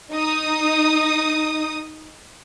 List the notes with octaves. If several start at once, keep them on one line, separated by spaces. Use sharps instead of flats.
D#4 D#6